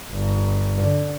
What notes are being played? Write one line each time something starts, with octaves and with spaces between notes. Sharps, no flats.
G1
D3